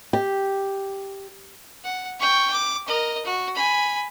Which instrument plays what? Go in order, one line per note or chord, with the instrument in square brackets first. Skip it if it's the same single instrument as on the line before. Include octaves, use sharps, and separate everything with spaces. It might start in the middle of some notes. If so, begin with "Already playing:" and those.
[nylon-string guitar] G4
[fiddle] F#5
G5 C#6
D6
A#4 D#5
F#4
G#5 B5